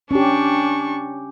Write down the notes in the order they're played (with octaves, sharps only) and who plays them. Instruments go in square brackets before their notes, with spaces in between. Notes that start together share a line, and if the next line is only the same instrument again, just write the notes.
[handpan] C#4 G4 [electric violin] D4 C#6